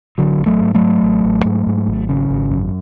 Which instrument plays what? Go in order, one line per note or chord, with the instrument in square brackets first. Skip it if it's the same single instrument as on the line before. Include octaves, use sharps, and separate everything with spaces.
[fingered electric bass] A1 D3 F#3
A1
F#3 A3
G#2
F#3 A3
G#2
A1
A1
G#2
G#2
G#1
C#3
G#1
F#2